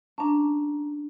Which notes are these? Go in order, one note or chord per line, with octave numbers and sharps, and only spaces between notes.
C#4 D4 A5 A#5